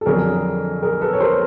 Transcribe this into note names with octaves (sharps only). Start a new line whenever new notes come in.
A4
F2 D3 F#3 G#4 A#4
G#4 A#4
A4 B4
C#5
A#4 C5